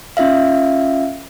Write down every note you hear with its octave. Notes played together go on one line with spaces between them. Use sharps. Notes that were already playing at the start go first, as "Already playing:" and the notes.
C#4 F4 E5 F5